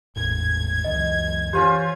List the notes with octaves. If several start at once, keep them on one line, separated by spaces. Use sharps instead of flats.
G#1 E2 A2 G#6
C#2 F#2 E3 D#5
E3 C#4 F4 G4 C5